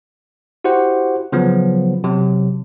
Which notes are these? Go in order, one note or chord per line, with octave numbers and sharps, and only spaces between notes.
E4 F#4 G4 C5 F#5
C#3 F3 F#3 B3
C3 F#3